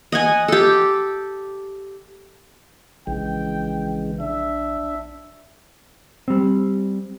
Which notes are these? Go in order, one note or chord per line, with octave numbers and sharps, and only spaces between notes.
D#5 F#5 G#5
G4 A4
A#1 C#3 E3 G#3 G5
D4 E5
G3 C4